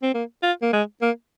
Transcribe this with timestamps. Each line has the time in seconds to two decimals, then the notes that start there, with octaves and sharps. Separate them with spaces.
0.03 C4
0.14 A#3
0.43 F4
0.62 A#3
0.73 G#3
1.02 A#3